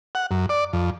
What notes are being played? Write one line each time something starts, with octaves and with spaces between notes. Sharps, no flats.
F#5
F#2
D5
F2